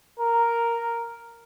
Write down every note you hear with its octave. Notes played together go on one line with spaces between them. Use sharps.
A#4